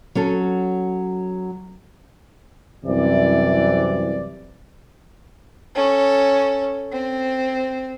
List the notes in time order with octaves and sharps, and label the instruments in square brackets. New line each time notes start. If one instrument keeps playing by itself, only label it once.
[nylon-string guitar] F#3 C#4 A4
[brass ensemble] C2 F#2 C3 E3 D5
[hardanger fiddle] C#4 A4
C4